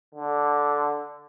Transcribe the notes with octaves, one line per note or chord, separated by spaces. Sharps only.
D3